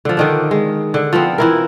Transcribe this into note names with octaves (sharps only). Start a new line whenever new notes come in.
D3 F3
D3 D#3 D4
G#3
D3
F3 B3 C4
E3 E4 A#4